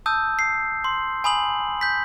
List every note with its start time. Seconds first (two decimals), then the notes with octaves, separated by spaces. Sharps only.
0.06 A5 D#6 E6 G6
0.39 C7
0.84 C6
1.24 G#5 B5 D#6 F#7
1.81 G6 B6